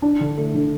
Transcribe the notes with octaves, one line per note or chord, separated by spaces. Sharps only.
D4
D3
A3
D3